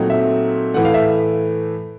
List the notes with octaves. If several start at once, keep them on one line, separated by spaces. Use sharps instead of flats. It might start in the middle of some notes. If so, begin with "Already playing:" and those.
Already playing: A#2 F#3 A3 C4 D#4
E5
A2 E3 A3 F#5
F5
E5